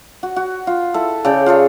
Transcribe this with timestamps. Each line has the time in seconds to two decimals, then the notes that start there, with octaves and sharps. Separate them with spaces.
0.23 F#4
0.36 F#4
0.67 F4
0.94 E4 A4
1.25 C#3 A4 D5 G5
1.46 F4 G#4 A4 C#5